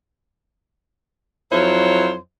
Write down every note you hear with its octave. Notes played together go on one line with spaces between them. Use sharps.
F2 F#3 E4 F4 C5 C#5